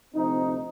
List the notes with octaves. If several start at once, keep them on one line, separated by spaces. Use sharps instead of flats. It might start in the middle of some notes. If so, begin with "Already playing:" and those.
D2 C3 F3 C4 D#4